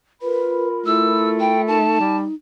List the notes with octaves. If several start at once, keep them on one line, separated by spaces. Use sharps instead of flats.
F4 A#4 B4 B5
A3 E4 E6
G5
D#4 A5
G3